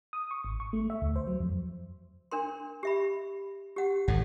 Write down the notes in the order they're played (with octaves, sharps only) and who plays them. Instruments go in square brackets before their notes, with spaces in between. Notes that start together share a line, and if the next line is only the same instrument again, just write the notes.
[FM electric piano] D#6
C#6
G#1
C#6
A3
E5
D2
C5
F#3
F2
[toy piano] D4 A#4 C6
G4 E5 B5
G4 F#5
[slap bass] G#1 A2 [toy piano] A4 F#5